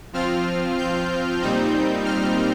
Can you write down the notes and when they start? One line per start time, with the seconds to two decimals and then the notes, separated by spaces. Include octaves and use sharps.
0.13 F3 C4 F4 F6
0.78 G6
1.42 A#2 G3 C4 D#4
2.05 F6